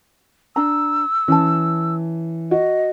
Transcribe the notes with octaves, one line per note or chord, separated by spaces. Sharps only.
D4 A#5 E6
E3 C#4 A5
F#4 D#5